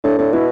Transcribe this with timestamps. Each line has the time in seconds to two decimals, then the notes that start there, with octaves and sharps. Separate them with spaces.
0.04 A2 D4
0.19 A2 D4
0.33 B2 E4